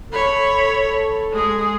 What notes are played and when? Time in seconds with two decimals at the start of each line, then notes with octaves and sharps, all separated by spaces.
0.12 A4 C#5 B5
1.33 G#3 G#4